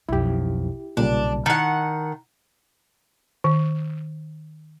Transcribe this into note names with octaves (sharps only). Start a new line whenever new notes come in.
B1 F2 E4 G4
B1 A#2 C#3 G3 D4
D#3 E4 F#5 A5
D#3